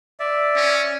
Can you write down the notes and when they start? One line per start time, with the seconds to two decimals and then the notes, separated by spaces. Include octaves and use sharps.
0.20 D5 E5
0.56 C#4